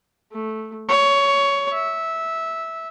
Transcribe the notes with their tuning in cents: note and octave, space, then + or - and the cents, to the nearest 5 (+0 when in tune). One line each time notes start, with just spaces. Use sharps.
A3 -5
C#5 +15
E5 -10